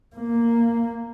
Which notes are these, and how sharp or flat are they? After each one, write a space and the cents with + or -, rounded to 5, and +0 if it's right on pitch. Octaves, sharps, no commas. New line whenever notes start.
A#3 -5